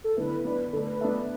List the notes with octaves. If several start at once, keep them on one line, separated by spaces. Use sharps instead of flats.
A4
D3 B3 E4 B4
B3 D4 B4 D5
D3 A3 D4 A4
B4
B3 D4 A4 B4 E5